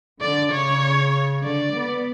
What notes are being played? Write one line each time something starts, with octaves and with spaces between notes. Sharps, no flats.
D3 D5
C#3 C#5
D3 D5
B3